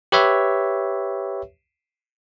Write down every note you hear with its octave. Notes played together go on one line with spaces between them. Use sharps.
G4 B4 C#5 E5